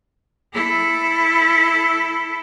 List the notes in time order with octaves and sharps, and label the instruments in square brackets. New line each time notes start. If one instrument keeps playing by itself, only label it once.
[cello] E4 A4